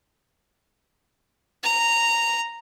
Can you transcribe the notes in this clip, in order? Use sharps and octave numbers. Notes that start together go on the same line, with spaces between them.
A#5